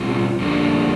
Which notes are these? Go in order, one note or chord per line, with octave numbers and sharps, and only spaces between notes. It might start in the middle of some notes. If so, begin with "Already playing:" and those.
Already playing: B2 G3 C4 F4 G#4
F2 D3 G3 A#3 D4